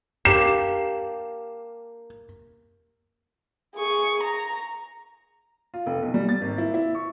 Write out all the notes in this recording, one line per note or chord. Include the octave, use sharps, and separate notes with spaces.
A#3 D4 G4 C7 E7
G#4 C#6
A#5
F4
F1
B1
G3
A6
G#1
E4
E4
C#6